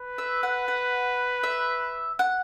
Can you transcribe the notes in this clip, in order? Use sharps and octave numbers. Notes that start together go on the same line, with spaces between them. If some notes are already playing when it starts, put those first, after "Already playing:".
Already playing: B4
E5
F#5
F#5
E5
F#5